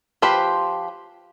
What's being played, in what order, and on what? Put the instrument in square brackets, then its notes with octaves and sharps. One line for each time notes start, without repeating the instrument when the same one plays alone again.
[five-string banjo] F3 G4 B4 C5